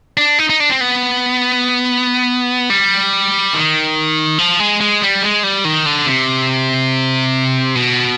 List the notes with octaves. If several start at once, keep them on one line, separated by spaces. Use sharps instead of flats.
D4
D#4
D#4
D4
C4
B3
G3
D#3
F3
G#3
G#3
G3
G#3
G3
D#3
D3
C3
B2